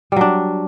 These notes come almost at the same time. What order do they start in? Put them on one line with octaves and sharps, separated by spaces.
G3 F#3 D4